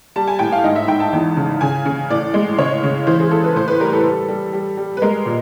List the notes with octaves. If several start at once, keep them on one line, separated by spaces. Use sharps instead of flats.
G3 A5
G#5
A2 G5
F5
G#2 D#5
E5
G#2 G5
A5
E2
C#3
C#3 G#5
C#3
A2 D5
G#3
C#3 C#5
C#3
E3 C5
G#4
E3 A4
B4
A2 C5
B4
G3 A#4
A4
G3
G3
G3
G3
B4
G#3 A#4
A#2